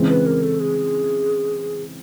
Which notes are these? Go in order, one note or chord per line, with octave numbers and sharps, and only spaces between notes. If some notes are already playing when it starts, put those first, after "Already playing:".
Already playing: C#3 E3 G#3 C4
B4
A#4
A4
G#4